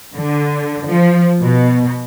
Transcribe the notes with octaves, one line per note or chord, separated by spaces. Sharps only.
D3
F3
B2